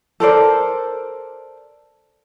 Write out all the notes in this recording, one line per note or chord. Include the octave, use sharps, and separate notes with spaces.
A4 A#4 C5 D5